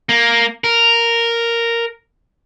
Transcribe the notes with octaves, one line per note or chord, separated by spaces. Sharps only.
A#3
A#4